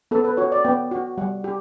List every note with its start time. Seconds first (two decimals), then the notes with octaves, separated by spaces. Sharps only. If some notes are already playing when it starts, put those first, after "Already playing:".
0.11 B3 A4
0.24 B4
0.37 F#4 C#5
0.52 D5
0.64 B3 G5
0.91 F#4
1.18 G3 F#5
1.44 G4